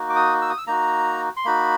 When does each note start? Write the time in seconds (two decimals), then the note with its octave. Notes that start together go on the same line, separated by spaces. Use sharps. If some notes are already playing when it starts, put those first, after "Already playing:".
Already playing: A#3 D#4 F#4
0.10 D6
0.16 D#6
0.42 E6
0.50 D#6
0.58 E6
0.67 A#3 D#4 F#4 A#5
1.37 C6
1.45 A#3 D#4 F#4 B5